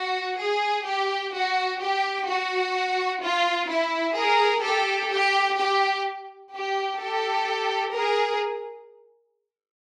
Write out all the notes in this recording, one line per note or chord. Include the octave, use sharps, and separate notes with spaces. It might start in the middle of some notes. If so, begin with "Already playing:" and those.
Already playing: F#4
G#4
G4
F#4
G4
F#4
F4
E4
G#4 A#4
G4 A4
G4
G4
G4
G4 A4
G#4 A#4